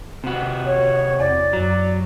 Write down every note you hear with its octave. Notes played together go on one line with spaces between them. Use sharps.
C3 F#4
C#5
E2 D5
F#2 F#3